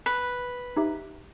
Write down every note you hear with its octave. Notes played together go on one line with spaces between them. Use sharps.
B4
D#4 G4 E5